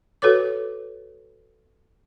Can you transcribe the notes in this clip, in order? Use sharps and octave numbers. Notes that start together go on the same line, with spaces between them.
F#4 A4 B4 C#5 D6